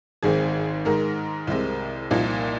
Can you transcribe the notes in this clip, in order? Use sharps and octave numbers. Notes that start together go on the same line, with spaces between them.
G#1 G#2 D#3 C4 G#4
G#2 D#3 G#3 A#4
C2 C3 G#3
C2 A#2 F3 A#3 D#4